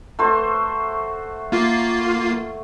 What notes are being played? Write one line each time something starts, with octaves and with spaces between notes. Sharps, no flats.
A3 F#4 C5
A#3 F4 C7